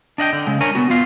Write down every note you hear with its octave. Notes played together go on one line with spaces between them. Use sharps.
D4 D#5 F#5 G5
D3
C#3 G#3
D4 A#4 C#5 G#5
B3 F#4
B3 F4 F5